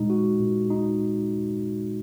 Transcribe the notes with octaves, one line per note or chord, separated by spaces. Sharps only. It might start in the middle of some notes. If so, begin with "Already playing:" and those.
Already playing: A#2 G#3 D#4
F#4
A#2
D#4